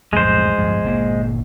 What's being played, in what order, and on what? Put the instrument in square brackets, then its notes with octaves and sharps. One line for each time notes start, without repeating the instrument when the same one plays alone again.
[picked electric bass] B1 F2 A2 [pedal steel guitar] G#3 C5
[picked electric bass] D1 G2 F3
G1 A#2 A#3